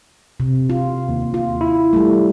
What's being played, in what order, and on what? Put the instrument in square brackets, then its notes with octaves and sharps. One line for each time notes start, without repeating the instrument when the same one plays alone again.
[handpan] C3
F4
[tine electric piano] D#2
[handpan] F4
[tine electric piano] E4
[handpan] G3 A3